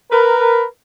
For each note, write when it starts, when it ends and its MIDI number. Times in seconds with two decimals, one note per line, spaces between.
0.11 0.64 70
0.11 0.64 71